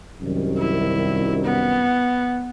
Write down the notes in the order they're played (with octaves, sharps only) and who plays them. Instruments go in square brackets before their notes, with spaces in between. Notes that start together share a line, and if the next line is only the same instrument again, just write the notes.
[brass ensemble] C2 F#2 D#3
[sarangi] E4
B3